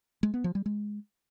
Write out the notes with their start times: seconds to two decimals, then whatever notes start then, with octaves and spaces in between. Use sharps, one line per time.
0.23 G#3
0.34 B3
0.44 F3
0.55 G3
0.66 G#3